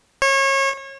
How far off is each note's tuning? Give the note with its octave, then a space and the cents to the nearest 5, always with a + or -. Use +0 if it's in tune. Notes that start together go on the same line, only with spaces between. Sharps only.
C#5 -30